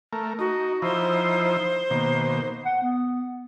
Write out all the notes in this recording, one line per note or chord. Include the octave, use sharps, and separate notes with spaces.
A3 A#4
D#4 F#4
F3 D#4 E4 C5
B2 D#3 A#3
F#5
B3